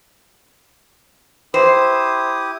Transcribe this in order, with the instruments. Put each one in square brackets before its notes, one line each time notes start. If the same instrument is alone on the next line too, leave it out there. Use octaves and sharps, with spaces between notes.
[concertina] E4 G4 D#6 [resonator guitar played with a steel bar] C5